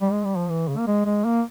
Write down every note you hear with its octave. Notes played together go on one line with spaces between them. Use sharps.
G3
G#3
G3
F3
E3
C#3
A#3
G#3
G#3
A#3